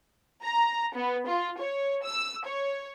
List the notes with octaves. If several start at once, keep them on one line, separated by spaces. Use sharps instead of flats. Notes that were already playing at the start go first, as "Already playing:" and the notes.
A#5
B3
F4
C#5
E6
C#5